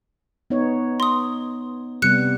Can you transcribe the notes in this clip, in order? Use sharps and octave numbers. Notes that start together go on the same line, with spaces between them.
B3 D#4 C#5
C6 D#6
C3 G3 B3 F#6 C#7